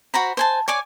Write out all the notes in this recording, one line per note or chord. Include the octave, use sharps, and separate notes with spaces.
F#4 C5 A#5 B5
C5 G#5 A5
C#5 D5 G#5 D6